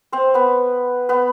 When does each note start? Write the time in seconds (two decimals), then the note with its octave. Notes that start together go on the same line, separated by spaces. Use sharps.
0.12 C4 C5
0.34 B3 B4
1.09 B3 B4